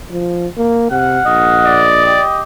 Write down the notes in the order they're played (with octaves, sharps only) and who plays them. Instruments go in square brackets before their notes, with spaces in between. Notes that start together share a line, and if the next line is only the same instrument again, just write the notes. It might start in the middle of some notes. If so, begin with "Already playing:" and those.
[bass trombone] F3
A#3
[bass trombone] C3 [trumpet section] F5 F#5
[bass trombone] A#1 [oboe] D#5
[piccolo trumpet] D5
[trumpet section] G4 [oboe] D#5